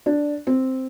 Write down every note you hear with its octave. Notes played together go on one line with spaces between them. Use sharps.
D4
C4